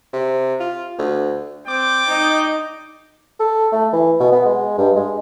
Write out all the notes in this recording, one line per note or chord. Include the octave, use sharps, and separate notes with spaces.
C3
F4
D2
C4 D5 G5 D6
D#4 D#5
A4
A3
E3
B2
B3
G#3
G2
G#3